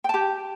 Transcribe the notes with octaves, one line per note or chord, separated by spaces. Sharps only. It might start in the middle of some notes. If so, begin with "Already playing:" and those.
G4 G5 A5